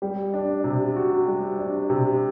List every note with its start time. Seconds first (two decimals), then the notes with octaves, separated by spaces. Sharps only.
0.02 G3
0.34 D4
0.64 C3
0.96 F#4
1.26 G3
1.58 D4
1.90 C3